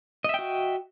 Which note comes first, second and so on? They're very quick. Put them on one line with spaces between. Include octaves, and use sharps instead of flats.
D#5 E5 G5 F#4